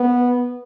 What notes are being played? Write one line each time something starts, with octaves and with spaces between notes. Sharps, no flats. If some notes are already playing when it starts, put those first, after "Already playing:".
Already playing: B3